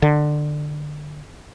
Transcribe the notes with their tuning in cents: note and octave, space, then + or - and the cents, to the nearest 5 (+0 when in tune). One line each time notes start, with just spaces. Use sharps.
D3 +20